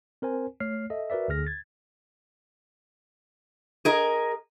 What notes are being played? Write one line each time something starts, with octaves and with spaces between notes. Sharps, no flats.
C4 A#4 C5 G#5
A3 C#5 F6 C7
A4 D#5 E5
F#4 A#4 B4 D5 E5
D2 D3 G#4 F6 A#6
G#6 A6
G#4 A#4 D#5